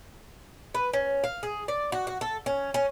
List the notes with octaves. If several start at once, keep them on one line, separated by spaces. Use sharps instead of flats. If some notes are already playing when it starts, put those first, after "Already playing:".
B4
C#4
F5
G#4
D5
F#4
F#4
A4
C#4
C#4